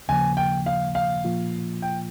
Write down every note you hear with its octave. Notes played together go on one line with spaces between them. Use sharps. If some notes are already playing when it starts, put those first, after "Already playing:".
D#2 C#3 F3 A#3 G#5
G5
F5
F5
A#2 F3 A#3 F4
G5